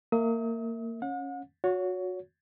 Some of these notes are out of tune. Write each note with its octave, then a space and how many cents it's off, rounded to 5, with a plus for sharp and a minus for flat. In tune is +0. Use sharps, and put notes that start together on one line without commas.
A#3 -25 E5 -15 D#6 +40
C#4 -10 F#5 -40
F#4 -25 C#5 +20